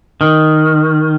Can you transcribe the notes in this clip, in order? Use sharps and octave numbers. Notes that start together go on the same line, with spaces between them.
D#3